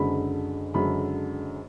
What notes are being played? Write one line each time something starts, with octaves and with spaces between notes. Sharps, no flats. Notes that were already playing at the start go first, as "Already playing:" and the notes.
Already playing: F#1 F#2 D3 G#3 B5
F#1 F#2 D3 G#3 B5